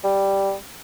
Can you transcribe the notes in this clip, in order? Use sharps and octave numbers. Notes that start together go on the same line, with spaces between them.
G3